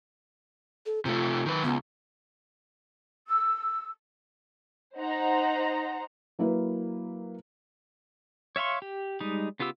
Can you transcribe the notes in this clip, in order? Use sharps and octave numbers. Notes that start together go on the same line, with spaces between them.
A4
C3 A3 F4
D#3 B4
C#2 B3
E6
D#4 C5 F#5 A#5
F#3 A#3 E4 A#4 B4
C#5 E5 F5 C6 C#6
G4
G3 G#3 D#4
C#3 B3 F4 G4 E6